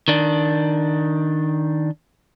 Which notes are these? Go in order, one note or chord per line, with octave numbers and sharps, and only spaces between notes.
D#3 D4